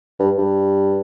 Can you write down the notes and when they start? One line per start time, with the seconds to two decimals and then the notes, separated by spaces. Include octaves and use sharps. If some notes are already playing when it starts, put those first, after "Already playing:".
0.19 G2
0.38 G2